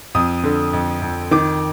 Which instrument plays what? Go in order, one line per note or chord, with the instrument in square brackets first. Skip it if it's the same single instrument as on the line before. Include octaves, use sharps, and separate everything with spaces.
[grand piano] F2 D#6
D3
F2
F2
D#3 D6